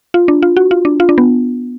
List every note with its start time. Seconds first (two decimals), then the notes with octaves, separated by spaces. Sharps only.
0.14 F4
0.28 D4
0.43 F4
0.57 F#4
0.71 F4
0.85 D4
1.00 F4
1.09 D4
1.18 B3